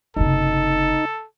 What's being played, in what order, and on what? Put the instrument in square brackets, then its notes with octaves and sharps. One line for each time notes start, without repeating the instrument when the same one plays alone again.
[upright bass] F#1 C3 [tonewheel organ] D#4 [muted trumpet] A4